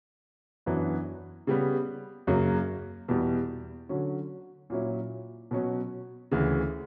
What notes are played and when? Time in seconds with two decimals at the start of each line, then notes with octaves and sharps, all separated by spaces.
0.66 F#2 E3 B3 D4 F#4
1.47 C#3 G3 B3
2.27 F#2 C#3 F#3 A#3
3.08 E2 B2 G3
3.89 D3 F#3 C#4
4.70 A#2 F#3 C#4 E4
5.51 B2 F#3 C#4
6.32 D2 C#3 E3